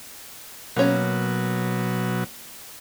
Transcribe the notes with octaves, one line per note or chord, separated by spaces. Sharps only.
B2 F#3 A#3 C#4